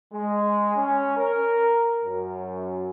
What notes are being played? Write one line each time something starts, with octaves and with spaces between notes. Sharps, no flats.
G#3
C#4
A#4
F#2